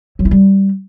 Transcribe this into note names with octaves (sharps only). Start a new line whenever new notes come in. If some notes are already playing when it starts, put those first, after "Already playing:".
F#3
E4
G3